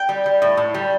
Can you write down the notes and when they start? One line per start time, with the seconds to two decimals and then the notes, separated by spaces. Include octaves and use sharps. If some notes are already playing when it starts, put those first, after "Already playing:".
Already playing: G5
0.09 G3
0.26 G3
0.42 A2
0.57 A2
0.74 G3